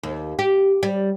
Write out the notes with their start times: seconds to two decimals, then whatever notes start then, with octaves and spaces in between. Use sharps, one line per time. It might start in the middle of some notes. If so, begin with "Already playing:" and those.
0.03 D#2
0.39 G4
0.83 G3